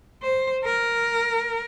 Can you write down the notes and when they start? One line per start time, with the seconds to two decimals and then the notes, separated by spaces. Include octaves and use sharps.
0.23 C5
0.64 A#4